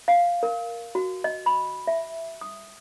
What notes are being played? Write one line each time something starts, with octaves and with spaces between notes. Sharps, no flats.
F5
A#4
F#4
D#5
B5
E5
D#6